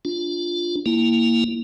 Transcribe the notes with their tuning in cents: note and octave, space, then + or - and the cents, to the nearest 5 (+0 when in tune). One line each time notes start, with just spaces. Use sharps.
D4 +0 F4 +0
A#3 +0 E4 +0